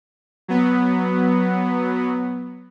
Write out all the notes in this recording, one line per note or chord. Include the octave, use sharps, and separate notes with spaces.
F#3 B3